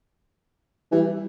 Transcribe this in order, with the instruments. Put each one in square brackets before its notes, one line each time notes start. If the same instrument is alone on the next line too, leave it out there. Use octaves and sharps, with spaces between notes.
[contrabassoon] E3 [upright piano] G3